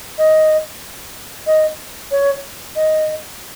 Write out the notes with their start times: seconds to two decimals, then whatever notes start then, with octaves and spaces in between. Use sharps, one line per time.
0.18 D#5
1.47 D#5
2.11 C#5
2.76 D#5